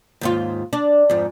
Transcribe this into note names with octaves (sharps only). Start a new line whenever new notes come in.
D#2 G#2 F4
D4
F2 G#2